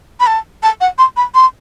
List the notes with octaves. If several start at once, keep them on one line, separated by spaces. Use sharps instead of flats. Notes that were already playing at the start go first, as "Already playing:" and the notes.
B5
A5
A5
F#5
C6
B5
C6